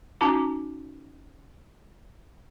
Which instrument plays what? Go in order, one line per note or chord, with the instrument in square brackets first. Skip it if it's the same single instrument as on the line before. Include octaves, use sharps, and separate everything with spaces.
[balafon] C#4 D#4 F#4 A5 A#5 D6